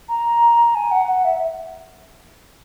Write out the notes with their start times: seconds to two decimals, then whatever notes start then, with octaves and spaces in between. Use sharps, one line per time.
0.09 A#5
0.75 G#5
0.91 F#5
1.08 F#5
1.25 E5